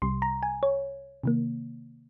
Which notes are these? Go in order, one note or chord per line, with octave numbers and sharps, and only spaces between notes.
C2 C3 G3 C6
A#5
G#5
C#5
C3 D#3 A#3